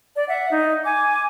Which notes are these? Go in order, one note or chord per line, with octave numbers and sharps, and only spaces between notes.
D5
E5 F#5
D#4
G#5 D6